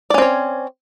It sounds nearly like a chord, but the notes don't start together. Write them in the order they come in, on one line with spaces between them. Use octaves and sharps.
D5 C#4 C4 C#5